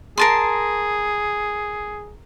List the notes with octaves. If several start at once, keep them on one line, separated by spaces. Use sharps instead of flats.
G#4 A#4 A5 C6